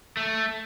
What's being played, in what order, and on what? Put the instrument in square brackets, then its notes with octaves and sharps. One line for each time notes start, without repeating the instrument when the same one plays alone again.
[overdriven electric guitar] A3